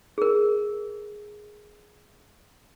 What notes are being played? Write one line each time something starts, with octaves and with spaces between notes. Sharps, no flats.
G#4 A#4